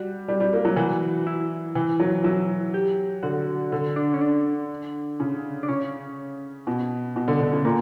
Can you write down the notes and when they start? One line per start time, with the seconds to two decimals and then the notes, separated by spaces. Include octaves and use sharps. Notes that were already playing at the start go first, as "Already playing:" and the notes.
Already playing: G3 F#4
0.28 G3
0.40 G3
0.53 A#3
0.65 F#3
0.76 E3 F#4
1.27 E4
1.75 E3
2.00 F#3
2.24 F#3 E4
2.74 G4
3.23 D3 F#4
3.72 D3
3.96 D4
4.14 C#4
4.21 D4
5.20 C#3
5.63 D4
5.68 C#3 C#4
6.67 B2
7.16 B2
7.28 D3
7.41 D3
7.53 C#3
7.65 A#2 A#3